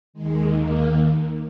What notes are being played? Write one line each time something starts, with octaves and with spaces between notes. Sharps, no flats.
D#2 D#3 G#3
A#3